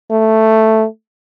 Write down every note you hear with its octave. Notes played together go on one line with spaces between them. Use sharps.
A3